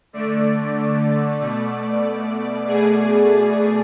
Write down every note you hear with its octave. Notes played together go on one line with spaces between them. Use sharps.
D3 A3 D5
B2 A3
B2 A3 G#4